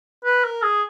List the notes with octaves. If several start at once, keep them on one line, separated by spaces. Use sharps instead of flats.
B4
A#4
G#4